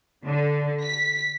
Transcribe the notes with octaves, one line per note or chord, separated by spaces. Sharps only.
D3
B6